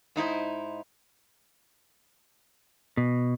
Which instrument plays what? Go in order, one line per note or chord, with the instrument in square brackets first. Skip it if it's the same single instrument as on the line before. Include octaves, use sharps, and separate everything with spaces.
[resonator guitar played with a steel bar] G#2 D#4 E4 C5
[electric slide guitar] B2